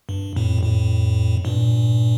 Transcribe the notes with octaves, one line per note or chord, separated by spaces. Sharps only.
G2
F2 A2
F2 A2
G2 A#2